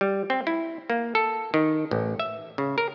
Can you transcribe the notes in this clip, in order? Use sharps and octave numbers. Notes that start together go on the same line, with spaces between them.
G3
C4
E4
A#3
A4
D#3
A1
E5
C#3
A#4